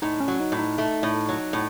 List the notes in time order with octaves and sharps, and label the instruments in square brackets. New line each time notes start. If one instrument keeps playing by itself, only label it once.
[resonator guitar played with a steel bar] A2 [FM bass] D#4
[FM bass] C#4
[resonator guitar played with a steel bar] F#3
[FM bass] D#4
[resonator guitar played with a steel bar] A2
[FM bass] D#4
[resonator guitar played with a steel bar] A3
A2
F#3
A2